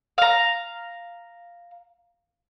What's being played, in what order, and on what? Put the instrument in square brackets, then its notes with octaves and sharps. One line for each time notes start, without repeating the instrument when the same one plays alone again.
[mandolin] F5 A#5